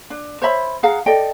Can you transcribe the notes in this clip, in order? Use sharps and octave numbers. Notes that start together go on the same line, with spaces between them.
D4
C5 C#5 E5 B5
G#4 F5 F#5 A#5
A4 D5 D#5 G5